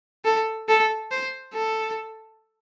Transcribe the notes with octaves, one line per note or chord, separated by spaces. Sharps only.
A4
A4
C5
A4